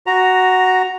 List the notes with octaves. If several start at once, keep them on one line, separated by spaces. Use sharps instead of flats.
F#4 A#5